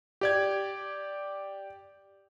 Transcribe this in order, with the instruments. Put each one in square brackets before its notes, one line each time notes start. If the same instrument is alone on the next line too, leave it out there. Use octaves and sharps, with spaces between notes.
[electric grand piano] G4 D5 G#6